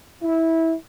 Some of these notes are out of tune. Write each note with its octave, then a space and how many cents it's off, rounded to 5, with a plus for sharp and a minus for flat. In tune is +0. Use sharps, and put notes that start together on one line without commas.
E4 -15